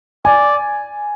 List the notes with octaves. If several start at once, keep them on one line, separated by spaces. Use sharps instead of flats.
D5 G#5